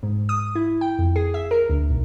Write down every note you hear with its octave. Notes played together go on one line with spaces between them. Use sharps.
G#2
D#6
E4
G5
F2
G#4
E5
A#4
D2
B1